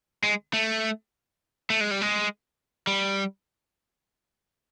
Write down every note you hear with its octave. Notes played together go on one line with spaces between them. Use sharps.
G#3
A3
A3
G#3
G3
G#3
G3